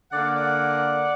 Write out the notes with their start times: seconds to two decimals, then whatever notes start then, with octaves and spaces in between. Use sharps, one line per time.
0.12 D3 A#3 D5 F#5
0.35 D5 F#5